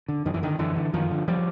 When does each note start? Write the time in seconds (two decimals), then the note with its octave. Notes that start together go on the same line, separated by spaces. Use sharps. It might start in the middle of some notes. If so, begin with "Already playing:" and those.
0.08 D3
0.25 F#2 D#3
0.34 E3
0.42 D3 D#3
0.59 F#2 D3 E3
0.76 D3
0.94 F#2 D#3 F3
1.11 D3
1.28 F3 G3